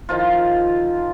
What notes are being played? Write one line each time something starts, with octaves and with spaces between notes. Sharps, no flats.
D#3 F3 F4